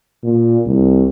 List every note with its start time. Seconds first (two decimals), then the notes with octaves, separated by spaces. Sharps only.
0.23 A#2
0.66 C2